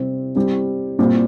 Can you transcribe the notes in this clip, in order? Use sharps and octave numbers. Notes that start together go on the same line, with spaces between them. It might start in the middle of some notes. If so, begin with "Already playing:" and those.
Already playing: C3 G3 C4 G4
G3 C4 G4
A#2 G3 C4 G4